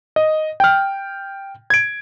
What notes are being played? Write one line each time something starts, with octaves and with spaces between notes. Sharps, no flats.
D#5
G5 F6
G#6 D7